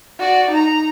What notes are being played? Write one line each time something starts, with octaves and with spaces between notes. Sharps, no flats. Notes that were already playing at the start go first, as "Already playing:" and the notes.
F#4 D5
D#4 A#5